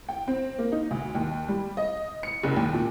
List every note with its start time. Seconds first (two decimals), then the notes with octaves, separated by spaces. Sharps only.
0.09 G5
0.28 C4
0.58 A#3
0.72 D#4
0.91 D2
1.15 D#2
1.48 G3
1.77 D#5
2.23 C#7
2.43 F#1
2.56 D#2
2.74 A#2